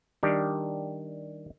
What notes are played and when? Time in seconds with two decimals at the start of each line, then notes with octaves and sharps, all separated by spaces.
0.23 D#3 G3 D4 G4